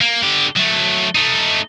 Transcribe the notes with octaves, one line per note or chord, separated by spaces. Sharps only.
A#3
D3 G4
F#3 A3
A3 D#4